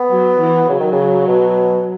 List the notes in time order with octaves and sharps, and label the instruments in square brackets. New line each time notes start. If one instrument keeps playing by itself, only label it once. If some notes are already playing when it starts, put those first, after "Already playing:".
Already playing: [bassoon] B3
[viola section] F#3
E3
[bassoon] C#3 [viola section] F#3
[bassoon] D#3
C#3
B2